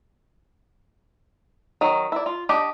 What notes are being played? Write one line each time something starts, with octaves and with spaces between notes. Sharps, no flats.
D#3 F#3
E4 D5
F4
D4 G4 D#5